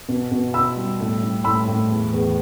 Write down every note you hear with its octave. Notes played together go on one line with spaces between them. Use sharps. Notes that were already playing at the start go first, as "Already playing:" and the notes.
B2
B2
B2 B5 E6
G3
A2
G3
A2 B5 E6
A2
E2
E2